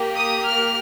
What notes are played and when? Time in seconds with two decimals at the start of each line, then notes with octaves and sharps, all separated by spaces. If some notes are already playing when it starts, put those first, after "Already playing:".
Already playing: A#3 G4
0.17 D#6
0.46 F6